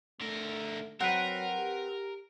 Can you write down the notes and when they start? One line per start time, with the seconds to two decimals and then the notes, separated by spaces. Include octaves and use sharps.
0.21 D3 A3 A#4
1.00 F#3 C4 A#4 B4 F#5
1.57 G4